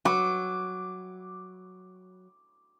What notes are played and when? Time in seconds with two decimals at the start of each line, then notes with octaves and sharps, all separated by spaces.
0.05 F#3 D6